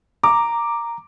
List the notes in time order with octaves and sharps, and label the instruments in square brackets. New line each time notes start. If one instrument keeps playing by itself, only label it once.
[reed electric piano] A#5 [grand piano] D6